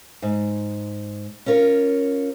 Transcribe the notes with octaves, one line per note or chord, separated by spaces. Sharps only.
G#2
C#4 F4 A#4 C#5